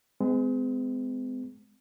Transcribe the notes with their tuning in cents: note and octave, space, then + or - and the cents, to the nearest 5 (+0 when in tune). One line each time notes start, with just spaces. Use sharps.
G#3 +0 C4 -45